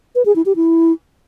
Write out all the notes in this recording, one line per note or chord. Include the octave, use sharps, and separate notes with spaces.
B4
G#4
E4
G4
E4